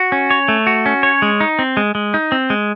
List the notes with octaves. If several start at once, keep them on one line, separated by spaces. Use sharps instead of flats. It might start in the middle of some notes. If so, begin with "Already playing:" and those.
Already playing: F#4
C#4
C#5
A3
F#4
C#4
C#5
G#3
D#4
C4
G#3
G#3
D#4
C4
G#3